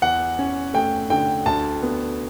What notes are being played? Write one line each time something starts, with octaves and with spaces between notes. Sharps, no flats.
E2 F#5
C#4
A3 G5
D3 G5
D2 A5
B3